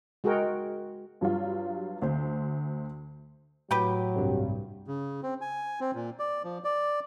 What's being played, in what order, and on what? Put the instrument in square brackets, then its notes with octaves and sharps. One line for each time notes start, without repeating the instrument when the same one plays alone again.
[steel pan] G#3 F#4 G#4 A#4 G5
[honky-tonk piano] G2 F#3 G3 F4
D2 C5
[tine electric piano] A2 [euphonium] F#3 [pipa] G4 B4 G5
[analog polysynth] C2 G2
[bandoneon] C#3
C4
G#5
C4
A#2
D5
F3
D5